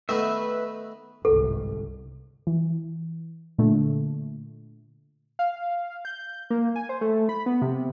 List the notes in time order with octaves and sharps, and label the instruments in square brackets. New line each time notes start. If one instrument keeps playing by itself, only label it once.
[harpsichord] D#3 A3 B3 [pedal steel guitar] B4 E5
[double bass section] G1 C2 G#2 [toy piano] A4
[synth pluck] E3
A#2 D3 A3
[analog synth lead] F5
G6
A#3
G#5
C5
A3
B5
B3
C3